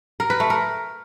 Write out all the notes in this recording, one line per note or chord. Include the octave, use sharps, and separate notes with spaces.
A#4
B4
A3
A#4